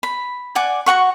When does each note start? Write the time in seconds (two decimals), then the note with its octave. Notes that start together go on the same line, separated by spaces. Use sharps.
0.03 B5
0.55 D5 F#5 G#5 D6
0.86 F#4 A4 F#5 C#6